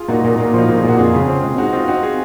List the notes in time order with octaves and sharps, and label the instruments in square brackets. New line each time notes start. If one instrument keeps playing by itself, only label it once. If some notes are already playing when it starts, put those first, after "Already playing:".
Already playing: [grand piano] F4 G#4
[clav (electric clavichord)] A#2 [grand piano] D#4 F#4
[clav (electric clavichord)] A#2
[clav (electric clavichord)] A#2 [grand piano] F4
[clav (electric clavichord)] F3 [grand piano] D#4 F#4
[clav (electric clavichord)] A#2
[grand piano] G#4
[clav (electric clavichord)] A#2 [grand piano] F#4
[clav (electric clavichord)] F2 [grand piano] F4 G#4
[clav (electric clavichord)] C#3
C4
G#3
[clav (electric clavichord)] G#3 [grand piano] D#4 F#4
[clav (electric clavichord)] C4 [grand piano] F4
[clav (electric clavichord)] C4 [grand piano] D#4 F#4
[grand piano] F4 G#4